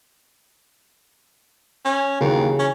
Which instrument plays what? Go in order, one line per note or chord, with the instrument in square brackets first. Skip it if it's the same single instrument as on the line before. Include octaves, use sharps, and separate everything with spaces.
[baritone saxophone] C#4
[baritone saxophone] D#2 [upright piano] C#3 E3 F#3
[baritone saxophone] C#4